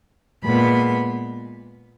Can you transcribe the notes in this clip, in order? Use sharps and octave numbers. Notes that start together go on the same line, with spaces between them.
A#2 G#3 B3 B5